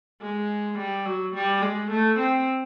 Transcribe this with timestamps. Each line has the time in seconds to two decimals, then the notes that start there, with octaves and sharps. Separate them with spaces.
0.22 G#3
0.78 G3
1.06 F#3
1.35 G3
1.62 G#3
1.91 A3
2.19 C4